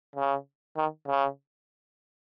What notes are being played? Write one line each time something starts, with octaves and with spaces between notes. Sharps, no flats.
C#3
D#3
C#3